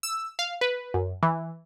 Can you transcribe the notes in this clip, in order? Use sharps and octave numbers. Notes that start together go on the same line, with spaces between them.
E6
F5
B4
F#2
E3